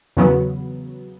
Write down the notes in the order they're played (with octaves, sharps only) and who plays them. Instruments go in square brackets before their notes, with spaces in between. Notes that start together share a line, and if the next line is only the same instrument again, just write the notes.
[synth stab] E2 C#3 F#3 B3